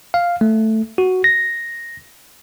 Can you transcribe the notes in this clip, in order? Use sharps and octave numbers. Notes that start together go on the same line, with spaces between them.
F5
A3
F#4
A#6